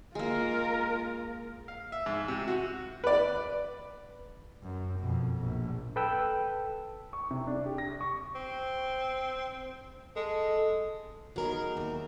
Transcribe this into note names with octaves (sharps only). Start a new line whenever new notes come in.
G#3 A#3 F4 A#4
F5
E5
G#2
C3
F#4
B4 D5
F#2
F2 B2
A#1
A4 B4 G5 E6
C#6
C3
D4
G4
A#6
C#6
C4
G#3 A4
F#3 B3 D#4 G#4 A#4
D#2 E5